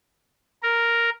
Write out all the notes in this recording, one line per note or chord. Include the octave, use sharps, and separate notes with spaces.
A#4